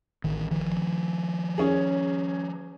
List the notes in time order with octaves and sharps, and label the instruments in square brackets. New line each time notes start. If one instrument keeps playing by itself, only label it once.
[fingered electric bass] A1 D#3
D#3 F3
[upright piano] C#4 G#4